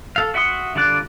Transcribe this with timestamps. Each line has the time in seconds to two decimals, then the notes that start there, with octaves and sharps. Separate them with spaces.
0.16 A4 F5
0.34 F#4 E5 F#5 C6 D#6
0.75 D3 G3 F4 D5 F#6